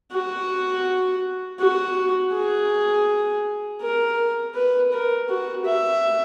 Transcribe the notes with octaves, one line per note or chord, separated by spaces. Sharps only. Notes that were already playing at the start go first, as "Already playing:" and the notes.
F#4
F#4
G#4
A#4
B4
A#4
F#4
E5